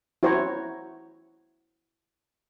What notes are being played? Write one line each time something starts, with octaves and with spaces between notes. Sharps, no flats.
E4 F#4 C5 C#5 A#5